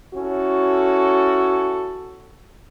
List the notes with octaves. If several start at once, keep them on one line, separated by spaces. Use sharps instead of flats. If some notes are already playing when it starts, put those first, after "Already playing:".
C#4 E4 F#4 A4